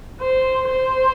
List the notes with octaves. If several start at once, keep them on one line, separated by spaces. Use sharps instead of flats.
C5
C5